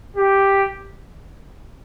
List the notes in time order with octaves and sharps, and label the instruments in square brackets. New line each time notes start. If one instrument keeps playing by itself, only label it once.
[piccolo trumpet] G4